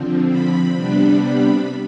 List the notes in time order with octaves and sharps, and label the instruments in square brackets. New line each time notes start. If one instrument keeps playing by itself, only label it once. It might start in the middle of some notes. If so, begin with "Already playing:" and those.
Already playing: [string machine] D3 F3 C4
B5
C3 G3 B3 D4 B5